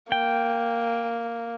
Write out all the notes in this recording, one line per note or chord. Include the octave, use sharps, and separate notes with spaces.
A#3 G5